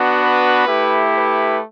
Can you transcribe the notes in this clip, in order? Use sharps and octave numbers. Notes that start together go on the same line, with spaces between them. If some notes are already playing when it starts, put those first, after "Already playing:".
Already playing: B3 D4 F#4
B4
A3 E4 G4
B4